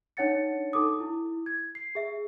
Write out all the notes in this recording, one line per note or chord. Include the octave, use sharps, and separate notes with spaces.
D4 D#4 C#5 F#5 A6 C#7
D#4 A4 D6 D#6
E4
G#6
C7
G#4 E5